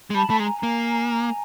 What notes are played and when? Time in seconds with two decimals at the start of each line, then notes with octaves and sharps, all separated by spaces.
0.10 G#3
0.15 G3 A5 B5
0.30 A3
0.40 G#3 G#5 A#5
0.63 A#3